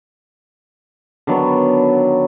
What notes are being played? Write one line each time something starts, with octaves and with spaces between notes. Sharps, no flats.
D3 D#3 F#3 B3